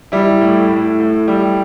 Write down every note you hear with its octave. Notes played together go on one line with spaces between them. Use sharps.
G3 E4
A2
A2
A2
G3